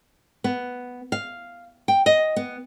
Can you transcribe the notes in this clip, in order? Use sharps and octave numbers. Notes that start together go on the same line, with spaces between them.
B3
F5
G5
D#5
B3